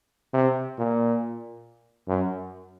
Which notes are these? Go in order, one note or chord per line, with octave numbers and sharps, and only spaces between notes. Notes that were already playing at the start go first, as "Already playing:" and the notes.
C3
A#2
F#2